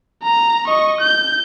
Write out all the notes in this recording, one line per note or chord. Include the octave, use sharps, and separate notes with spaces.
A#5
D#5 C#6
G6